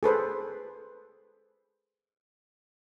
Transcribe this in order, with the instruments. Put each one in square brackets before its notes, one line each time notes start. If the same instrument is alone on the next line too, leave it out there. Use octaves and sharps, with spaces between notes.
[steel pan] G#4 A4 B4 C5